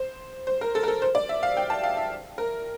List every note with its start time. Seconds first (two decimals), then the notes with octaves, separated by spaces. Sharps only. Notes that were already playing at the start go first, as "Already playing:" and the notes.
Already playing: C5
0.47 C5
0.61 A#4
0.75 A4
0.83 A#4
0.88 A4
1.02 C5
1.15 D5
1.29 E5
1.43 F5
1.57 G5
1.70 A5
1.83 F5
1.97 E5
2.38 A#4